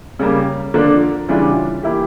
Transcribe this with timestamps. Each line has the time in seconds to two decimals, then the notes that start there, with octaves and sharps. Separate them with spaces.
0.19 C#3 G3 A#3
0.74 D3 F3 A#3 D4 F4
1.28 C#3 E3 G3 D4 F4
1.83 E3 A#3 E4 G4